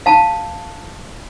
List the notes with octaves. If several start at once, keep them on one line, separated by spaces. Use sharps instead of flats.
F5 A5